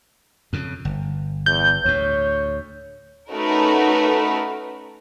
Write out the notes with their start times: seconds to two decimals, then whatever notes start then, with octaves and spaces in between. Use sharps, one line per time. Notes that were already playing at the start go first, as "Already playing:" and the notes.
0.53 F2 C#3
0.85 G1
1.46 E2 G6
1.85 D2 A2 C#5
3.32 A3 C#4 D#4 F#4 A#4 B4